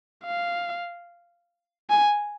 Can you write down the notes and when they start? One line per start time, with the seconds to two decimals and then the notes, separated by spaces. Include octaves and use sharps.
0.25 F5
1.90 G#5